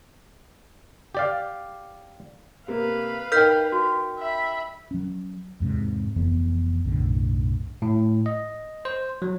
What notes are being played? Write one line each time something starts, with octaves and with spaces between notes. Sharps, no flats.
G4 D5 F5
C3 A#3 B4 F5
D#4 A#4 G5 F6 G6 B6
F#4
E5 B5
F#3 C#4
E2 G#2 C3
F1 F2 E3 B3
B1 F#2 A2 D3
A2
D#5
C5
F#3